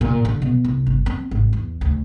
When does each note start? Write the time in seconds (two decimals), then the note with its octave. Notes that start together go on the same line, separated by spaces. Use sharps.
0.01 A#2
0.25 D3
0.42 B2
0.64 C2
0.86 G1
1.06 C4
1.31 G#1
1.53 E2
1.81 D2